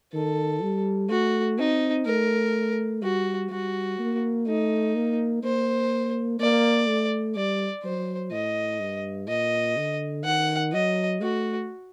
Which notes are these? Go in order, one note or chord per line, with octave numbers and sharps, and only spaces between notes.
D#3 A4
G3
A3 F#4
C4 D#4
A3 A#4
G3 F#4
G3 F#4
A#3
A3 D#4
A#3
A#3 C5
A#3 D5
A3
G3 D5
F#3 C5
A2 D#5
G2
A#2 D#5
D3
D#3 F#5
F#3 D#5
A3 F#4